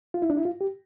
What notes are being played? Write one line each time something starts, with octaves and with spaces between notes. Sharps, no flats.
F4
E4
D4
E4
F4
G4